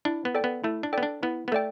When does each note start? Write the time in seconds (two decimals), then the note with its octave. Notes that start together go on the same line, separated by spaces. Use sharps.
0.05 D4 E4
0.25 B3
0.35 A4 D5 G5
0.44 B3
0.64 A3 E4
0.83 D4
0.93 B3 A4 D5 G5
1.03 D4
1.23 B3 E4
1.48 B3
1.52 A3 A4 D5 G5